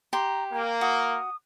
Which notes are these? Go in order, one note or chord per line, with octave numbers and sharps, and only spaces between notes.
G4 A#5 C6
A#3 G5
F#4 D#6